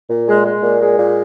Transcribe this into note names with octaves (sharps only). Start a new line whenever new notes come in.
A#2
G#3
G#3
A#2
G#3
A#2